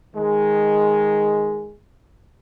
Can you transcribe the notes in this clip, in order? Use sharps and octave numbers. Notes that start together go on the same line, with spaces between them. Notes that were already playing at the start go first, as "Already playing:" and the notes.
D#3 G#3